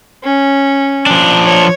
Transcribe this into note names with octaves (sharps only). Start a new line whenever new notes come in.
C#4
F3 D4
C#5